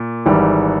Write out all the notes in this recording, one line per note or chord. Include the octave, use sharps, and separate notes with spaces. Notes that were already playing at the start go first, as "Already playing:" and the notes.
Already playing: A#2
G#1 G#2 E3 G3